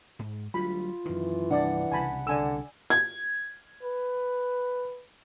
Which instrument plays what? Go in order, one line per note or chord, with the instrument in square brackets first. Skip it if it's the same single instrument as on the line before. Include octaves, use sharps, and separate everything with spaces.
[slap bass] G#2
[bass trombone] D2 [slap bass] F#3 G3 [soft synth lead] F4 [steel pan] B5
[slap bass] F#2 D#3 [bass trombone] E3
[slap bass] C2 G2 F3 [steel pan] D4 D5 [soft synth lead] F#5
[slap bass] C2 C#3 [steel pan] G#5 A5 B5
[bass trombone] D3 [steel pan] D5 G#5 E6
[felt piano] G#6
[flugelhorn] B4